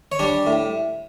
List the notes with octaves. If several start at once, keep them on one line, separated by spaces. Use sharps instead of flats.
C#5
G3 D4 D5
A2